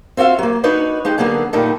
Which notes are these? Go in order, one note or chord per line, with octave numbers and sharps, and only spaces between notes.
C4 F4 F#4 E5 F5
F#3 A#3
D4 D#4 F#4 B4 C#5
G#3 D#4 G4
D3 F#3 A#3 B3 G#4
F#2 A#2 D#3 G3 A3 D#4